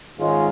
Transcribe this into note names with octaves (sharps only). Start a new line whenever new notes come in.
G#2 D#3 G#3 C#4 F4